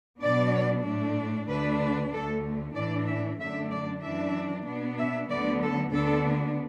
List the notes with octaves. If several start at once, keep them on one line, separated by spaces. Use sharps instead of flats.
B2 F#3 B3 D4 D5
A2 A3 D4
D2 D3 A3 D4 B4
B4
D2 D3 A3 A4
A2 E3 D4 D5
E5
F#2 D3 A3 D4 E5
D5
F#2 E3 D4 E5
B2 B3 D4
E5
D2 D3 F#3 B3 D5
A4
D2 D3 B3 D4 A4